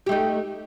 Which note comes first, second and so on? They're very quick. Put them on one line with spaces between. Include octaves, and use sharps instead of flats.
G4 A3 D#4